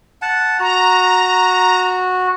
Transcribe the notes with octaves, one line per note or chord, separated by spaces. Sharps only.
F#5 A5
F#4 A#5